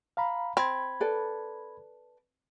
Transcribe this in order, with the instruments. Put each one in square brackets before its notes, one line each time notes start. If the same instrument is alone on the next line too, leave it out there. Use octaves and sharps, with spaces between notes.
[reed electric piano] F5 A#5 B5
[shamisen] C4 [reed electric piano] B5 G#6
[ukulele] A4 B4 D5